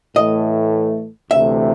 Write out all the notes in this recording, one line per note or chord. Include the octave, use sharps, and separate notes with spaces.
A2 E3 A3 D#5
D2 C3 E3 A3 E5